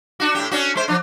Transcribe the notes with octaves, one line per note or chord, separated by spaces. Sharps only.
D4 F#4
A2 D4 G4
C#4 D4 F#4
G#3 C5
F3 D4